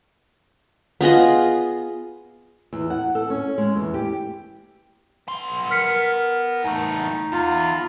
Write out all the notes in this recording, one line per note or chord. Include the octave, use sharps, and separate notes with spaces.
B3 F4 G#4 D#5
E2
F#5
A4
C#4
G#3
E2
G4
B3 C6
A#4 F6 B6 C#7
E2 A3 D#4
E2 F4